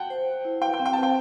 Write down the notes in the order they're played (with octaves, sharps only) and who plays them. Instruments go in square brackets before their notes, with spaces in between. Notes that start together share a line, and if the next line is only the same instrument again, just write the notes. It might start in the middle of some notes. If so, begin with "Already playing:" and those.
Already playing: [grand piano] F#5 G5 A5
[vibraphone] C5
C5
E4
[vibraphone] B4 [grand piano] G5
[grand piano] G5
[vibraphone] C4
[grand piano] G5
[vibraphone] C5 [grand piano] A5
[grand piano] G5